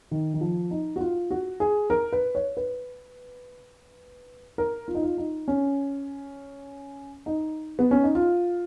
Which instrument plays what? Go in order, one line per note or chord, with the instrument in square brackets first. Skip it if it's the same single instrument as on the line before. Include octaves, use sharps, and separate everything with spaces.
[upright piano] D#3
D#3
F3
D#4
F#4
F4
F#4
G#4
A#4
B4
C#5
B4
A#4
F4
D#4
F4
D#4
C#4
D#4
B3
C#4
D#4
F4